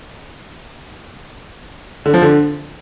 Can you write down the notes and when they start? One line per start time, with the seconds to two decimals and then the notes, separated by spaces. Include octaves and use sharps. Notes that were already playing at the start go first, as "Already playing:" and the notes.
2.06 D3
2.14 F3
2.22 D3